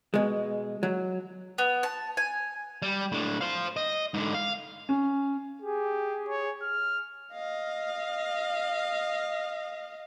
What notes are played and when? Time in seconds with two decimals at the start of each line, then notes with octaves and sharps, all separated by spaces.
0.14 B2 G#3
0.83 F#3
1.58 B3
1.83 A5
2.17 G#5
2.82 G3
3.12 A2 D4
3.41 C5 F5
3.77 D#5
4.14 G#2 D3
4.34 F5
4.89 C#4
5.62 G4 G#4
6.29 C#5
6.62 F6
7.32 D#5 F5